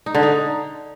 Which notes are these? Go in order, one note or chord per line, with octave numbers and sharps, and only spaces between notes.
D#4
D3
D#4